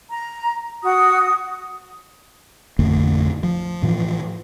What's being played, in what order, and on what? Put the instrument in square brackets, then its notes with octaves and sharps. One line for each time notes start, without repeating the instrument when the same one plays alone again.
[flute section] A#5
F#4 D#6
[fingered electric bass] A1 F2 D3 A3
F3
A2 E3 F3